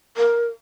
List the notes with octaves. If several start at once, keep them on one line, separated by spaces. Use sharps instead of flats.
A#4